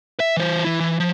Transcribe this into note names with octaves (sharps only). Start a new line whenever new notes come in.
E5
E3 C5
E3 E4
E3
F3